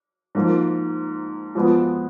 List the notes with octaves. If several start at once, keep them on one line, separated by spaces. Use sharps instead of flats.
G#2 F3 A#3
F2 F3 G#3 B3